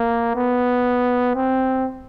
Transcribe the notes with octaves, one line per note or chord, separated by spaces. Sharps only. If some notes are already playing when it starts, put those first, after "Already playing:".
Already playing: A#3
B3
C4